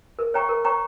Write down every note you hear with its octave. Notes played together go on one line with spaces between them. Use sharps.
A#4
C#5 G5 A#5 C#6
A#4
C#5 G5 A#5 C#6